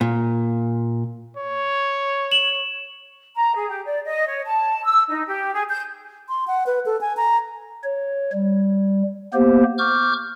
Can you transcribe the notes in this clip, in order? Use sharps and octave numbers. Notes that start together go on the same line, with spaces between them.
A#2
C#5
E7 F#7
A#5
G#4
G4
D5
D#5
C#5
A5
E6
D#4
G4
G#4
G6
C6
F#5
B4
A4
G#5
A#5
C#5
G3
A#3 B3 G4 C5
C#6 D6 F6 G6